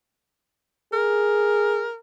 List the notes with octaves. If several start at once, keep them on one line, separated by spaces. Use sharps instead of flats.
G#4 A#4